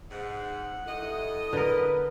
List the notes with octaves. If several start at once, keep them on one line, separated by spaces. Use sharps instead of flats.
G#2 F#5
G2 E4 A4 D#5
D3 A#4 B4